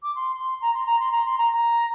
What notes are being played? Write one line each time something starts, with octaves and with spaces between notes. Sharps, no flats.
D6
C6
C6
A#5
C6
A#5
C6
A#5
C6
A#5
A#5